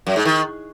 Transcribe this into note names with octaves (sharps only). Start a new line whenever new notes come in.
F#2
G#2
D#3